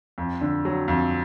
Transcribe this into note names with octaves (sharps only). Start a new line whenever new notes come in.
F2
D3
F#3
F2